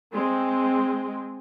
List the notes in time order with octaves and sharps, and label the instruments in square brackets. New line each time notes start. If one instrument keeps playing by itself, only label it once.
[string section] G#3 C4